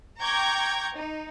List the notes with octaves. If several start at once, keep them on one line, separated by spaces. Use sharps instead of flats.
G5 A#5 C#6 D6 G6 G#6
D#4